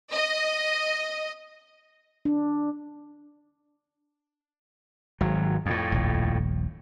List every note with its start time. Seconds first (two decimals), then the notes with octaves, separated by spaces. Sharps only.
0.11 D#5
2.25 D4
5.21 G#1 F#3
5.66 F2 A2
5.92 D#1 A#1